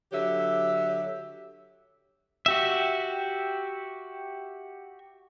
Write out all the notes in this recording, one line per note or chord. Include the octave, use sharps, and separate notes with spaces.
D3 F#3 G4 E5
F#4 G4 E5